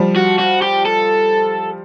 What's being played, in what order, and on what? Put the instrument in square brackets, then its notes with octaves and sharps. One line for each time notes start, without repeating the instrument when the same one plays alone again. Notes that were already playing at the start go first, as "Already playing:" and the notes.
Already playing: [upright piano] F3 G3
[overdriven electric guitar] F#4
F#4
G4
A4